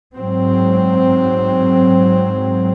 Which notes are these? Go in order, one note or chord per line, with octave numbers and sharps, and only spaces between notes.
G#2 F#3 C4